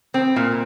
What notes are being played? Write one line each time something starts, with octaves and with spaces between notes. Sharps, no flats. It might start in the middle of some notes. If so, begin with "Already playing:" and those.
C4
A#2